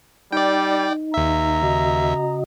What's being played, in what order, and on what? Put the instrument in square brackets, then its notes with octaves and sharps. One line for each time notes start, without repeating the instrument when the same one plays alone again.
[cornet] G3 [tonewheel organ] D#4 [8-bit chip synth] D5 G5
[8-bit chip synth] D#2 E5 [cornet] A#5
[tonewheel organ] C#3 F#4 D#5